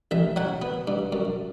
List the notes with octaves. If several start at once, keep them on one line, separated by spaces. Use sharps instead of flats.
A1 E5
F#3 F#5
B3
G2
F#2